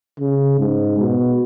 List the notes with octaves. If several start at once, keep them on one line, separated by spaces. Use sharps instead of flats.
C#3
G#2
B2